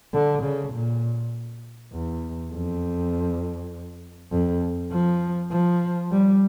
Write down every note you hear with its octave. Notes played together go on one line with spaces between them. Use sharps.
D3
C#3
A#2
E2
F2
F2
F3
F3
G3